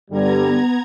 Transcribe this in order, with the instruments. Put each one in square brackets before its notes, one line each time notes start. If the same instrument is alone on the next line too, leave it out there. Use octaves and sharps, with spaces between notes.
[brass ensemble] G2 D3 G3 [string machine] B3 A#5 G#6